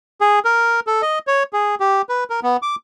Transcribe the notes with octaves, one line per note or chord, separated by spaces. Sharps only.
G#4
A#4
A4
D#5
C#5
G#4
G4
B4
A#4
B3
D6